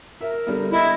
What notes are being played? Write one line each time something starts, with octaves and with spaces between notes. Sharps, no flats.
A#4 E5
D3 G3 B3
E4 D#5